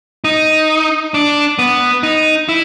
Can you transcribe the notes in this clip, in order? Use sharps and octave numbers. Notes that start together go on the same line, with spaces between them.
D#4
D4
B3
D#4
E4